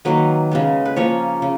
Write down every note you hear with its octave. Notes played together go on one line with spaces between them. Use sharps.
D#3 F#3 A#3 B4
C#3 G#3 B3
B4
F3 A#3 C#4 C#5
C#3